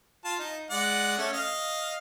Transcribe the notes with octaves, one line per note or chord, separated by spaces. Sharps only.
F4 A5
D#4
G#3 D5 F#5
A3 C#4
D#5 F5